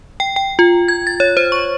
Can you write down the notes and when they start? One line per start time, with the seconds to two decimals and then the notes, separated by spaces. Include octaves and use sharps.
0.20 G5
0.36 G5
0.59 F4
0.88 G#6
1.07 A6
1.20 C#5
1.37 C5
1.52 C#6